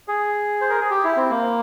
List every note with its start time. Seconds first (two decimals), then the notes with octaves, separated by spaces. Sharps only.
0.08 G#4
0.61 C5
0.70 A#4
0.81 G#4
0.90 G4
1.04 E4
1.17 C4
1.30 A#3